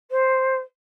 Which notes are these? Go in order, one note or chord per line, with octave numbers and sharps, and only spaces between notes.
C5